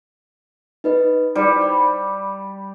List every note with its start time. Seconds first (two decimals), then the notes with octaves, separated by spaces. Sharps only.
0.84 D#4 B4 D#5
1.35 G3 D#4 C5 D5
1.61 D5